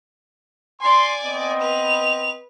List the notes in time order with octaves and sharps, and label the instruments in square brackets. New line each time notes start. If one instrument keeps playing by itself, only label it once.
[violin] D5 G#5 [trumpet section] C6
[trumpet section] B3 C4 D#5
[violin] B4 F7